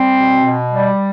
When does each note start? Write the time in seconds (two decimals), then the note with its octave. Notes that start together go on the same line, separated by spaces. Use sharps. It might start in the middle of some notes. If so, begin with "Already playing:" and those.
Already playing: G3 C4
0.19 B2
0.45 B2
0.72 G3